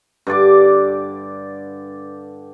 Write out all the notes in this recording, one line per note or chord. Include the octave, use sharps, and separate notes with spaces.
G2 D3 D5 D6